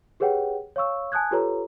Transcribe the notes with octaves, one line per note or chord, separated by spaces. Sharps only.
G4 G#4 B4 C#5 F#5 G5
C#5 F5 C#6 E6
G#5 A5 D#6 F#6 G#6
F4 G4 A4 B4 C#5 A#5